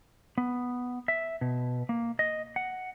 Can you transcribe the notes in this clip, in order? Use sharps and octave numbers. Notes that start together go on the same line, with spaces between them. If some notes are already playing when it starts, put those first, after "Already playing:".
B3
E5
B2
A#3
D#5
F#5